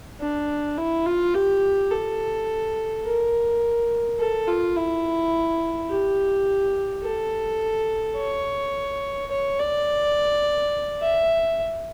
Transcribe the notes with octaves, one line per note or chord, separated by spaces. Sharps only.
D4
E4
F4
G4
A4
A#4
A4
F4
E4
G4
A4
C#5
C#5
D5
E5